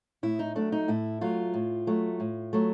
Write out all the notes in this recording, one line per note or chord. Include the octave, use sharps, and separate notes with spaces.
A2 E4
D#4
F#3 A3 D4
D#4
A2 E4
F#3 A3 F4
A2
F#3 A3
A2
F#3 A3